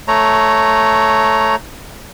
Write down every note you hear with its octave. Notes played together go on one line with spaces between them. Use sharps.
A3 C#5 A#5